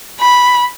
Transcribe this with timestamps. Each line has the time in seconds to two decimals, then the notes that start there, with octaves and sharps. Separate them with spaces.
0.21 B5